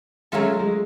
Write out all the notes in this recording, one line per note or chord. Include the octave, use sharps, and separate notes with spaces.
F#3 G#3 A3 C#4 F4 A4
G#3